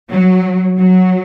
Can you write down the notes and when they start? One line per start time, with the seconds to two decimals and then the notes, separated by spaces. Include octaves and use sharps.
0.10 F#3
0.79 F#3